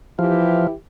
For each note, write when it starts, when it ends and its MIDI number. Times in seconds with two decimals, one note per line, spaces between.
0.19 0.71 52
0.19 0.67 53
0.19 0.71 64
0.19 0.71 67